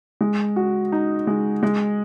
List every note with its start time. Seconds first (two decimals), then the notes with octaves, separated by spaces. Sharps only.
0.21 G#3
0.56 F#4
0.92 D#4
1.27 G#3
1.63 G#3